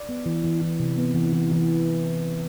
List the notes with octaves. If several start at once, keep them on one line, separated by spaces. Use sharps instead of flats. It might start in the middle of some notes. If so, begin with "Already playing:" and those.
Already playing: D5
B3
E3
E3
E3
C3
B3
E3
E3
E3